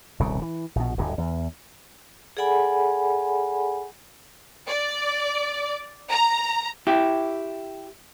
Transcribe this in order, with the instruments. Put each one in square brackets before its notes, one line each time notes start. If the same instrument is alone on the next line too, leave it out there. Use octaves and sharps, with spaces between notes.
[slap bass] D#1 C2 C#3
E3
A#1 B2
D1 G2 D3
E2
[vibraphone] G#4 A4 D5 F#5 G#5 B5
[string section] D5
A#5
[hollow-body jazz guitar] E4 G4